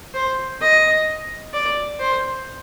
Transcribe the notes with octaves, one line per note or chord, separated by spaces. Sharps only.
C5
D#5
D5
C5